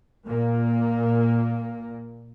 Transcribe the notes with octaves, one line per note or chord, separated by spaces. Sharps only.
A#2 A#3